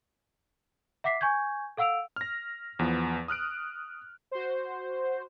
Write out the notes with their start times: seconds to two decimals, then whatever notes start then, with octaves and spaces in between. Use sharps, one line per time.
1.04 E5 F#5 D6 B6 C7
1.21 G#5 C#6 G6 G#6
1.77 A4 F5 F#5 E6 D7 F7
2.16 F6 A#6
2.79 E2 F3 B3
3.28 D#6 F6 F#6 D7
4.31 F#4 C5